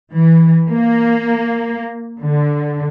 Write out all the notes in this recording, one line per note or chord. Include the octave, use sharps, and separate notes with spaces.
E3
A#3
D3